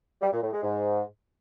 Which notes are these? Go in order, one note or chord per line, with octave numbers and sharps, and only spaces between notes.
G3
A#2
A2
G#3
G#2